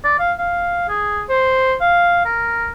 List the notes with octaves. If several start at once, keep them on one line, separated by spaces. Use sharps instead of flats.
D5
F5
F5
G#4
C5
F5
A#4